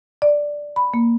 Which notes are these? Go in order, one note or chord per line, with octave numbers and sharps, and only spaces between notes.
D5
B5
A#3